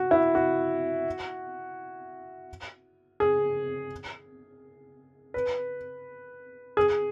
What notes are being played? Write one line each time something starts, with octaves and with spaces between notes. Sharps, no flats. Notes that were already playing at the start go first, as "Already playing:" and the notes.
Already playing: F#4
E4
F#4
G#4
B4
G#4